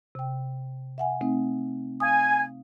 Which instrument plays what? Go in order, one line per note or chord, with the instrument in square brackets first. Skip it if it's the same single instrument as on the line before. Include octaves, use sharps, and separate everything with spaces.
[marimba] C3 G5
E5 F#5 G#5
A3 C4 D#4
[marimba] F5 D#6 [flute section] G#5